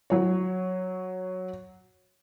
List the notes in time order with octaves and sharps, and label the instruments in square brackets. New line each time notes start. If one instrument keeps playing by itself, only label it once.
[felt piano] F#3 C#5